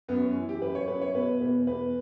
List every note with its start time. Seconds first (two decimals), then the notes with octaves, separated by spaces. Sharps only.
0.08 F#2 B3
0.21 C#4
0.35 E3
0.49 G4
0.62 F#2 B4
0.75 C#5
0.88 F#2 B4
1.01 C#5
1.14 B2 B4
1.41 E2 B4
1.67 E2 B4